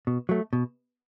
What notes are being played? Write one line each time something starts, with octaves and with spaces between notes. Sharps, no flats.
B2
F#3 A3
B2